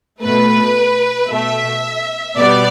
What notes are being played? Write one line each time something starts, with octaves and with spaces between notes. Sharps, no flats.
B2 A3 B4
B2 A3 E5
B2 G3 B3 D5